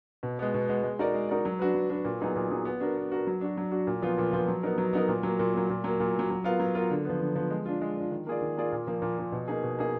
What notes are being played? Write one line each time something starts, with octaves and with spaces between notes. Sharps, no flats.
B2
G#3 B3
B2
G#3 B3
G#3
D#4 F#4 A#4 D5
G#3
D#4 F#4 A#4 D5
F#3
D4 F#4 B4
F#3
D4 F#4 B4
A#2
F#3 B3 D#4 G#4
A#2
F#3 B3 D#4 G#4
B3
D4 F#4 A#4
B3
D4 F#4 A#4
F#3
D4 F#4
F#3
D4 F#4
A#2
F3 B3 F4
A#2
F3 B3 F4
F#3
B3 D#4 A#4
F#3
B3 D#4 A#4
A#2
F#3 A#3
A#2
F#3 A#3
A#2
F#3 A#3
A#2
F#3 A#3
F#3
B3 F4 A#4 F5
F#3
B3 F4 A#4 F5
D3
F3 B3
D3
F3 B3
G#3
D4 F4
G#3
D4 F4
D#3
A#3 F4 G#4 D5
D#3
A#3 F4 G#4 D5
A#2
F3 A#3
A#2
F3 A#3
B2
A#3 D#4 G#4
B2
A#3 D#4 G#4